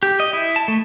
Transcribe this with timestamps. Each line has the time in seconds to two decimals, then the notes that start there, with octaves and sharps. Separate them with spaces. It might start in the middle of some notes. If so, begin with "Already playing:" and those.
0.03 G4
0.20 D#5
0.33 E4
0.56 A5
0.68 A3